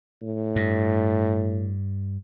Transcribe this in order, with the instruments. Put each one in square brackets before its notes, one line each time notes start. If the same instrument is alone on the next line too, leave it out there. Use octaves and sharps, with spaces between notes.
[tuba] A2
[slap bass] G2